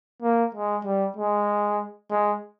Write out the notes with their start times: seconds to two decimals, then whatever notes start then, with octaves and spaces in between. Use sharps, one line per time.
0.22 A#3
0.55 G#3
0.85 G3
1.17 G#3
2.11 G#3